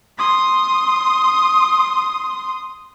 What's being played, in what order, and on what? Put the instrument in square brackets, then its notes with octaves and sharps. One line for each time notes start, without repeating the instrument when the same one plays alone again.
[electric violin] C6 D#6